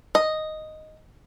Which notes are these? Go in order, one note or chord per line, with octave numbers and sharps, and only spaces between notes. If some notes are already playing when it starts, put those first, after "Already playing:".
D#5